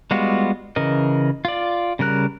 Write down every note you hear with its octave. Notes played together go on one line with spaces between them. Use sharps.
G3 G#3 B3 F4 F#4
C#3 E3 A#4 D#5
F4 D5
C#3 G3 A#4 F#6